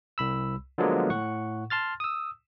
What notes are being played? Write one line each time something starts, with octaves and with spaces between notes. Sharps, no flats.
C2 B5 E6
D3 F3 F#3 G#3 A#3 B3
A2 F#5 C#6
A5 C6 F6 A6
D#6 E6